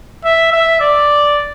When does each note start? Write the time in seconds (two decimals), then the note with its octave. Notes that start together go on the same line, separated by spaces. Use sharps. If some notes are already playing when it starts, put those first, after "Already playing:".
0.24 E5
0.52 E5
0.81 D5